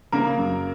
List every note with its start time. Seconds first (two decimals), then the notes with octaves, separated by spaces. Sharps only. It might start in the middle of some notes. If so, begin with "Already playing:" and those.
0.12 C#3 A#3 A#4
0.38 F#2